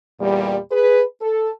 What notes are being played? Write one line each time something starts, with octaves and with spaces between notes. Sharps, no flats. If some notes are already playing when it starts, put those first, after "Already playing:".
E2 A#2 G3
G#4 B4
A4